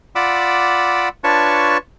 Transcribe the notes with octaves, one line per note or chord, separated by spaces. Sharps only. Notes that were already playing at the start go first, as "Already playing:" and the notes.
F4 D5 F#5 B5 D6 E6
D4 F4 B4 C#5 A5 C#6